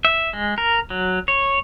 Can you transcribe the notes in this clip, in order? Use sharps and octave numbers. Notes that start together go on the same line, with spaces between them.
E5
G#3
A#4
F#3
C#5